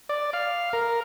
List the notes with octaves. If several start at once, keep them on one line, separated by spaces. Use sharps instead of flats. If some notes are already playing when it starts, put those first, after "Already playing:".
D5
F5
A#4